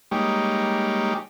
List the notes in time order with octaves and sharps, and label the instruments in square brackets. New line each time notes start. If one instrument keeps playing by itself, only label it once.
[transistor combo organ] G3 G#3 A#3 D#4 G4 C#5